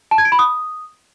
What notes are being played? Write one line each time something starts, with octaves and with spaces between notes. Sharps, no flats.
A5
G#6
D7
B5
D#6